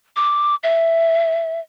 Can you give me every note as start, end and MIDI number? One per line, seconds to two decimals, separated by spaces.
0.16 0.55 86
0.63 1.60 76